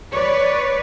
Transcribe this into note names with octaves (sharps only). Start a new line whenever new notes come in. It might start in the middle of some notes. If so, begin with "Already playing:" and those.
B4 C#5 D5